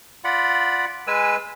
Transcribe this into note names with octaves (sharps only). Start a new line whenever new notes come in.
F4 D5 F#5 B5
G#3 B4 G#5 E6